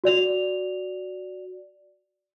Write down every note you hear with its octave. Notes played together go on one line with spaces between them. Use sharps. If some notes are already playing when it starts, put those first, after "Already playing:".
F#4 D5 F7